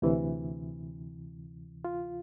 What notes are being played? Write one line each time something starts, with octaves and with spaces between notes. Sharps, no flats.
D2 C3 E3
F4